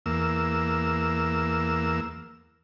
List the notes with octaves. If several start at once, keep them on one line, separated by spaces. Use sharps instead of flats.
E2 A#3 E6